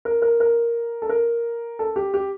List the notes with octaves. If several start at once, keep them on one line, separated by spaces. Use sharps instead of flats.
A#4
A#4
A#4
A4
A#4
A4
G4
G4